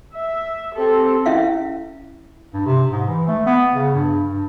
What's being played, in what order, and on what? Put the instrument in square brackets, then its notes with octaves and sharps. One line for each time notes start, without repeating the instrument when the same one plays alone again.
[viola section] E5
C4 G4 A4
[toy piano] C#4 E4 E5 F5
[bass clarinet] G2
C3
G#2
E3
A3
B3
C#3
G2
G2